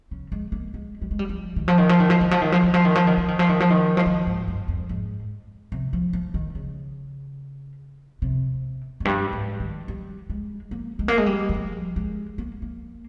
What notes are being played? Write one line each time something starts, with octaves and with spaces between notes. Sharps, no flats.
C#3
G#3
A#3
G#3
G3
G#3
G3
F3
D#3
F3
D#3
F3
D#3
F3
D#3
F3
D#3
F3
D#3
F3
D#3
F3
D#3
F3
D#3
F3
D#3
F3
D#3
F3
D#3
G#2
G2
F2
G#2
C3
F3
F3
D#3
C#3
C3
F2
G2
G#2
D#3
G3
G#3
A#3
G#3
A#3
G#3
G3
D#3
F3
G#3
A#3
A#3